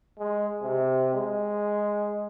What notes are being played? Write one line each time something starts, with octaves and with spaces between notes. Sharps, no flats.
G#3
C3
G#3